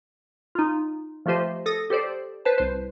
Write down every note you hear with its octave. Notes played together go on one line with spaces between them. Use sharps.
D#4 F4
F3 A3 F4 G4 C5 D#5
A4 D#6 A#6
G4 A4 C5 D5
B4 C5 A5
C2 C5